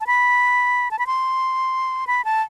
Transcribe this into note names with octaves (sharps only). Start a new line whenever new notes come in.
A5
B5
A5
B5
C6
B5
A5